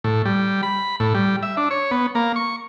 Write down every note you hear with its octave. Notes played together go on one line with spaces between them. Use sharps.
A2
G3
B5
A2
G3
E5
D4
C#5
B3
A#3
C#6